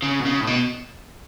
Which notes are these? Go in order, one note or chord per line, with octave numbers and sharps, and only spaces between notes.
C#3
B2
C#3
A2
B2